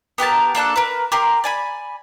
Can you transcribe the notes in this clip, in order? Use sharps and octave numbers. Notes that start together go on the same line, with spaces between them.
B3 G4 A#4 A5
A#3 D4 A4 F#6
A#4 B4
G4 A#4 C6
D5 G#5 B5